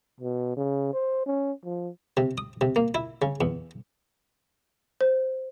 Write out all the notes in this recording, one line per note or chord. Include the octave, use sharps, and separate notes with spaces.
B2
C#3
C5
C#4
F3
C3
D#6
C3
A#3
E4
C#3
E2
C5